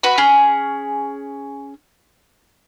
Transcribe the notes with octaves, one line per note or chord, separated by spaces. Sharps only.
F#4 B4 B5
C#4 G#4